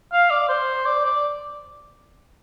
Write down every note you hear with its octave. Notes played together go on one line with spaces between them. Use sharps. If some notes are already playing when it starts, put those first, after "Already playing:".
F5
D5
C5
D5
D5